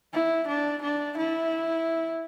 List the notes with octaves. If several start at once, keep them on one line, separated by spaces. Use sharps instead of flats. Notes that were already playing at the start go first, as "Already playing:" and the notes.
E4
D4
D4
E4